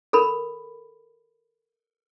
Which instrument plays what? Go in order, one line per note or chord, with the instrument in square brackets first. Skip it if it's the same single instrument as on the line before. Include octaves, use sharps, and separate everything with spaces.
[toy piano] A4 A#4 B5